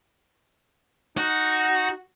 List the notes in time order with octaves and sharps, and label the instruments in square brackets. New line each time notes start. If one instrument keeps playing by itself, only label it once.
[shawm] D#4 [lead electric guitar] F#4